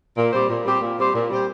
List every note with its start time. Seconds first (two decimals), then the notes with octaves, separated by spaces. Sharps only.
0.16 A#2
0.33 G3 C4 G4 C5
0.49 A#2
0.65 G3 C4 G4 C5
0.81 A#2
0.98 G3 C4 G4 C5
1.14 A#2
1.30 G3 C4 G4 C5